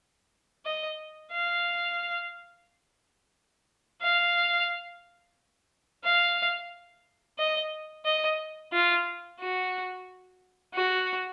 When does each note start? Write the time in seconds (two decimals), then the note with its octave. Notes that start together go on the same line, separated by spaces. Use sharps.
0.65 D#5
1.32 F5
4.02 F5
6.04 F5
7.38 D#5
8.05 D#5
8.72 F4
9.40 F#4
10.74 F#4